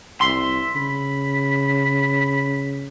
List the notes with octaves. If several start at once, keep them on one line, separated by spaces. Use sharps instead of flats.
C2 E5 C6
C#3 B5